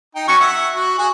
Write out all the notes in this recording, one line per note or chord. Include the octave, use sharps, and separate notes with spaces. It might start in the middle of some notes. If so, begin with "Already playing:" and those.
D#4 G5
F#3 C#4 C#6
E5 F#5
F#4
F#4 G#4